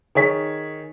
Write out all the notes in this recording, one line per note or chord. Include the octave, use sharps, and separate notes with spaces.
D#3 G#4 C#5 B6